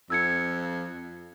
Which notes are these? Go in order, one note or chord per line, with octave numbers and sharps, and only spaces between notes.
F2 E6 G#6 C#7